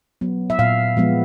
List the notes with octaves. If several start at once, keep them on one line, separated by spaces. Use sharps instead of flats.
F#3 B3
E5
A#2 F5
F3 G#3 B3